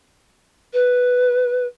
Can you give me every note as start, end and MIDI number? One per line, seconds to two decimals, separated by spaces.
0.73 1.66 71